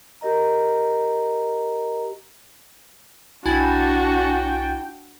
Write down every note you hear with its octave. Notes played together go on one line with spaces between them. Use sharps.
G4 A#4 D#5 A#5
B1 D4 E4 F#4 G5 G#5 A6